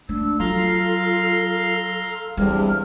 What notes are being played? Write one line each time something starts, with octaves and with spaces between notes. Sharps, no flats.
A3 D4 E6
F#3 F4 A4 F5 A#5 C6
E2 G2 C3 G3 G#4 F6